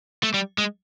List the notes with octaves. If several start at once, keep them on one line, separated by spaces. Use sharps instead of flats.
A3
G3
G#3